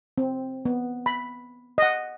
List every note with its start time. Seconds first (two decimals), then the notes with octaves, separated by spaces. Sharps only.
0.18 C4
0.65 B3
1.06 B5
1.78 D#5 F#5